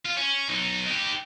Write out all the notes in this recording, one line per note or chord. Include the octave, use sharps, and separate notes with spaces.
F4
C#4
B1 D#4
D#4 G4